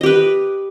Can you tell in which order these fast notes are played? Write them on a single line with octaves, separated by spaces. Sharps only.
D#5 G4 B4